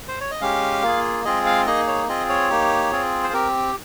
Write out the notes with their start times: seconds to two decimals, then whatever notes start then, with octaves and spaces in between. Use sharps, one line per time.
0.08 C5
0.20 C#5
0.31 D#5
0.41 G#3 C#4 G4 F5
0.83 A#3 F4 G#4
1.25 G#3 C4 F4 G#4 D#5
1.46 F5
1.66 A#3 D#4 G#4 D#5
1.87 C#5
2.09 C4 F4 G#4 D#5
2.29 C#5
2.50 A#3 D#4 G4
2.92 C4 F4 G#4
3.24 C5
3.33 C4 G4 A#4